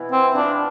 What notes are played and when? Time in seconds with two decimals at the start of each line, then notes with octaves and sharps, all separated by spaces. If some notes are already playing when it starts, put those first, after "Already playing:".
Already playing: B2 E3 B3 E4
0.12 C4
0.35 B3 D4 F4